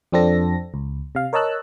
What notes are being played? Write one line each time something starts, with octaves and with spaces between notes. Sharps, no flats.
F2 F3 C4 D4 A4 A#6
C#2
C3 F5
A#4 C#5 D#5 A5 E6 F#6